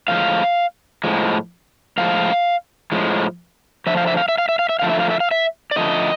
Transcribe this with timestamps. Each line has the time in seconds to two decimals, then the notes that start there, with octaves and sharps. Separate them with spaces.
0.08 A2 F3 G#3 F5
1.04 A2 F3 G#3
1.98 A2 F3 G#3 F5
2.92 A2 F3 G#3
3.86 D3 F3 A3 E5
3.97 F5
4.07 E5
4.17 F5
4.29 E5
4.38 F5
4.49 E5
4.59 F5
4.69 E5
4.79 D3 F3 A3 F5
4.89 E5
5.00 F5
5.10 E5
5.20 F5
5.31 E5
5.71 D5
5.76 D3 F3 A3 D#5